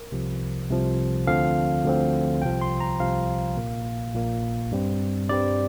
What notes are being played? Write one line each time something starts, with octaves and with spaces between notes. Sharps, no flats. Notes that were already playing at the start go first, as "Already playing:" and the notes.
Already playing: A#4
C2 C3 F3
C2 C3 F3
D2 D3 F3 C4 F5
D2 D3 F3 C4
C2 C3 F3 G5
C6
A#5
C2 C3 F3 F5
A#1 A#2 A#3
A#1 A#2 A#3
G2 G3 C4
G2 G3 C4 D5